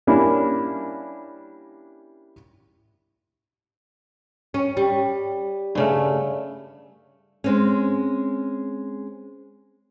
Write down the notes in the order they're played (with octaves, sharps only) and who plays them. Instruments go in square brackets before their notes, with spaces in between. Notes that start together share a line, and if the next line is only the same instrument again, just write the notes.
[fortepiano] G3 A#3 C#4 D4 E4
[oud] C#4
G3
[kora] G2 C#3 A3
[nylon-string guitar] G#3 C4 C#4